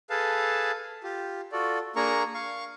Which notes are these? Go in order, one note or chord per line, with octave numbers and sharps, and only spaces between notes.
G#4 A4 B4 F5 A5
F4 G4
F4 F#4 A4 D5
A#3 D4 G#4 A#4 A#5 C#6
F5 C#6